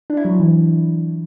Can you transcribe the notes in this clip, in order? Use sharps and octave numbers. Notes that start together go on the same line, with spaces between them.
D4
E4
F#3
F3
E3